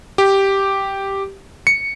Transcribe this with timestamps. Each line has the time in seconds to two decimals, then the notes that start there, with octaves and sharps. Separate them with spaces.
0.18 G4
1.67 C#7